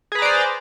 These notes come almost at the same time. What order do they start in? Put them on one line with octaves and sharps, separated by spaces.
G#4 B4 A#5 D5 C5